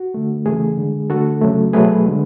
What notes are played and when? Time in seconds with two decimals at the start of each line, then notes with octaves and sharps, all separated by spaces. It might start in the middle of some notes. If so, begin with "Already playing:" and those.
Already playing: F#4
0.14 D3 A3
0.46 C#3 E3 A3 G#4
0.77 D3 G#3
1.10 D3 A3 F#4 A4
1.42 C#3 F#3 A3
1.73 B2 F#3 A3 G#4 B4
2.06 D3 G#3